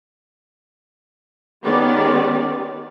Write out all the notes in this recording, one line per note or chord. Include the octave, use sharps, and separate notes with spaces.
D#3 G#3 B3 C#4 G4 D5